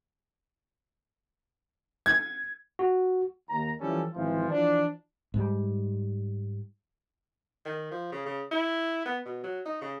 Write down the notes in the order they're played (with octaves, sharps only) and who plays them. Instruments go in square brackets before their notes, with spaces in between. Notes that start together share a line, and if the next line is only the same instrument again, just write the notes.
[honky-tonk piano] G#6
[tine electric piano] F#4
[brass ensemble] D#2 A#5
E3 F3 G3 C#4 A4
G#1 E3 F3
E3 F3 D4
[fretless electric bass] G#2 G3
[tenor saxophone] D#3
F3
C#3
C#3
E4
B3
B2
F#3
D#4
C#3